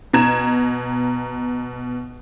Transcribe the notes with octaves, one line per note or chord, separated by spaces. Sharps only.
B2 A#5 G#6 E7